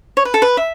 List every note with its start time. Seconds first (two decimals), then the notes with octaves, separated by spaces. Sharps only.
0.17 C#5
0.25 B4
0.34 A4
0.42 B4
0.57 E5